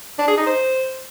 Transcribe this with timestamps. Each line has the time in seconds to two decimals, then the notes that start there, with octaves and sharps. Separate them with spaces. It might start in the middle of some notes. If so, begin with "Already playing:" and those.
0.19 D4
0.28 G#4
0.37 D#4
0.46 C5